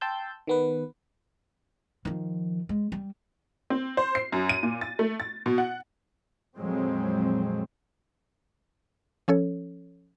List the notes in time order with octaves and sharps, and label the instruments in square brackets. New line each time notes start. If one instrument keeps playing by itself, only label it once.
[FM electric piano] G5 A5 C6 E6 G6
D#3 B3 B4
[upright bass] D#3 F3
G#3
G3
[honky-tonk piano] C4
C5
C7
F#2
D#7
A#2
A6
A3
A6
B2
F#5
[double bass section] F2 A#2 F#3 G#3 C4
[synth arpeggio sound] F3 C#4 A4 C#5